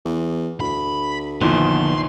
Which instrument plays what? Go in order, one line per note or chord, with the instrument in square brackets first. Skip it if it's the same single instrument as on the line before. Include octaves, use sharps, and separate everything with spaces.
[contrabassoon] E2
[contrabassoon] D2 [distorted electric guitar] B5
[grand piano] A#1 E2 D#3 [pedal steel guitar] D3 F3 B3 [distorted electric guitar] C6